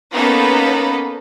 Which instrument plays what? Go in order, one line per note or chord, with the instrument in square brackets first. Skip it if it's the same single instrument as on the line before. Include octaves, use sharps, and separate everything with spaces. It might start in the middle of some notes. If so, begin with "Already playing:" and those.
[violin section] A#3 B3 C#4 D#4 A4 B4